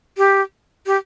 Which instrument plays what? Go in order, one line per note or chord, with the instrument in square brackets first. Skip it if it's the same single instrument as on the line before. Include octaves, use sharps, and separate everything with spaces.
[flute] G4
G4